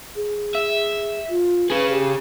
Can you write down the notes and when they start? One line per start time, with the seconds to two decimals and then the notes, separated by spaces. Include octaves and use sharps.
0.16 G#4
0.55 E5
1.29 F4
1.70 C#4 G#4 B4
1.90 G4